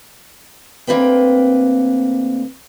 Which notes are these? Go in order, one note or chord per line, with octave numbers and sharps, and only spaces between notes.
D2 A#3 C4 B4 G5